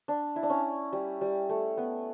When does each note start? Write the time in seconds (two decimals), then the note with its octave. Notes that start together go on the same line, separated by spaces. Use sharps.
0.08 D4
0.36 E4
0.43 D4
0.50 C#4
0.93 G3
1.21 G3
1.49 A3
1.77 B3